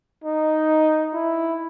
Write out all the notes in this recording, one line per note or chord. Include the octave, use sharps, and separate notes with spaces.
D#4
E4